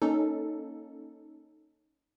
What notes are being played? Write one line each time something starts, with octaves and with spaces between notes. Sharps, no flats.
A#3 C#4 D#4 A4